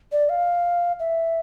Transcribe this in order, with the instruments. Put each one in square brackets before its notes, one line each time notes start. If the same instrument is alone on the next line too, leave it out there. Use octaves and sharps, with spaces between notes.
[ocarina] D5
F5
E5